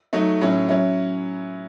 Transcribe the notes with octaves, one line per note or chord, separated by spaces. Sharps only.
F#3 A3 D#4
A2 F#3 C#4 E4
F#3 C#4 E4